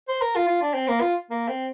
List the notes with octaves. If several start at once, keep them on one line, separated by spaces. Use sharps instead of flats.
C5
A#4
F4
F4
D4
C4
A#3
F4
A#3
C4